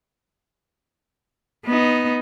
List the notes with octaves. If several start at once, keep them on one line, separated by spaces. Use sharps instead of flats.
B3 D#4